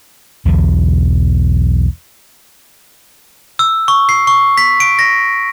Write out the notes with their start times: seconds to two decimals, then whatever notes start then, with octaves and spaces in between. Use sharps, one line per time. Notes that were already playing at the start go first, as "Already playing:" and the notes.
0.45 B1 E2 B2 D3
3.59 E6
3.88 C#6
4.09 C7
4.27 C#6
4.58 B6
4.80 D7
4.99 A#6